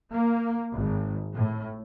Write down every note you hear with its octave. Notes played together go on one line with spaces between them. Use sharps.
A#3
G#1
A2